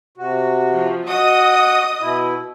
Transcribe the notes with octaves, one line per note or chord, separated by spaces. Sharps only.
C3 F#4
F3
F#4 D#5 F#5 D#6
B2 E4